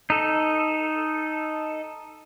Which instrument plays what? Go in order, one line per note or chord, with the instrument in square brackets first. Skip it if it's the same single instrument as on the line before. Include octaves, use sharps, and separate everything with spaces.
[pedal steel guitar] D#4 A4